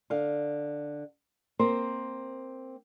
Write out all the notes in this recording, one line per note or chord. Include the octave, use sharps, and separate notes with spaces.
D3 F5
A#3 C4 C5